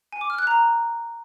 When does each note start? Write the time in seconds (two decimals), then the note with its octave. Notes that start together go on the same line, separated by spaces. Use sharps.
0.13 G#5
0.21 D6
0.30 F6
0.38 F#6
0.47 A#5